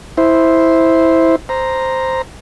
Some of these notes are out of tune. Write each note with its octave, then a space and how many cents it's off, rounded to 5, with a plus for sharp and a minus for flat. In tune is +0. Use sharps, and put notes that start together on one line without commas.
E4 -10 C5 +0
C5 +0 A#5 +0